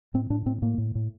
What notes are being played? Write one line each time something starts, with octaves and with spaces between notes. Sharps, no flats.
A2 C4
A2 D4
A2 C4
A2 A#3
A2
A2